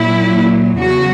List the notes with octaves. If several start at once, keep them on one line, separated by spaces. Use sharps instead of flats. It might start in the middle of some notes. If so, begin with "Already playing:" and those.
Already playing: A#2 F#3 E4
E2 C#3 F#3 F#4